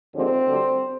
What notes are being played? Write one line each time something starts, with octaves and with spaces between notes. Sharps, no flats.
D#2 D3 F3 G#3 C4
D2 D3 G3